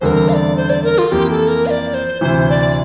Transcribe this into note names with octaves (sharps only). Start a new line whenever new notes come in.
E2 D3 G3 C4 A#4 C5
F5
D5
C5
D5
A#4
F4
F2 E3 A#3 G4
A4
A#4
F5
D5
C5
D2 C3 E3 C5
D5